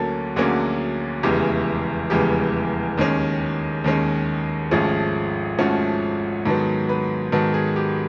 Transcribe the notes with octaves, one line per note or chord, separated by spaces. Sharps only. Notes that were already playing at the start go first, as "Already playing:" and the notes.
Already playing: D2 D3 F#3 A#3 C#4 A4 A#4
D2 D3 F#3 A#3 C#4 G#4
F1 E2 C#3 E3 G#3 G4
F1 E2 C#3 E3 G#3 G4
D#2 D#3 G#3 C#4
D#2 D#3 G#3 C#4
G#1 G#2 F3 A3 C#4 G#4
G#1 G#2 F3 A3 C#4 F#4
G#2 D#3 F#3 B3 A4
B4
G#2 D#3 F#3 B3 A4
G#4
G4